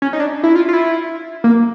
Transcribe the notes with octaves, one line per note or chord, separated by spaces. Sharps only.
C#4
D#4
D4
E4
F4
F4
E4
A#3